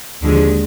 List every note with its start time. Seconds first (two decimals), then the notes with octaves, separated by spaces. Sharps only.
0.21 D#2 D3 F3 G#3